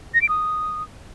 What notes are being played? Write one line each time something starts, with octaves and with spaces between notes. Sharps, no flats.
A#6
D7
D#6